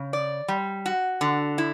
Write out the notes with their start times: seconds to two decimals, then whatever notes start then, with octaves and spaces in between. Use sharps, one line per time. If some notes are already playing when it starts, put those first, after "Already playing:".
Already playing: C#3
0.13 D5
0.48 G3
0.86 F#4
1.21 D3
1.58 E4